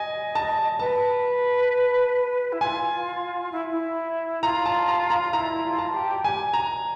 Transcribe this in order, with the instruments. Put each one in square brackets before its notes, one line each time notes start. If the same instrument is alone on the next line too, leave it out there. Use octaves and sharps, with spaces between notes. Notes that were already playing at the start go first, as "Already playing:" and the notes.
Already playing: [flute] D#5 [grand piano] G#5
[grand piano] A5
[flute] B4 [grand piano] A5
[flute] E4
[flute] F4 [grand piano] G#5
[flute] E4
E4
[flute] F4 [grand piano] A#5
[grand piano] A5
A#5
A#5
[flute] E4 [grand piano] A#5
[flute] F4
[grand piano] A5
[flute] G4
[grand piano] G#5
A#5